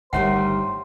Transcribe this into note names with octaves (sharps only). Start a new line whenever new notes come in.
G1 D2 D#3 G3 C5 C#5 E5 F#5